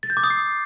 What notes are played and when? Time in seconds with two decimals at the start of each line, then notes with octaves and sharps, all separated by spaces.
0.03 A6
0.10 G6
0.17 D6
0.24 D#6
0.30 C7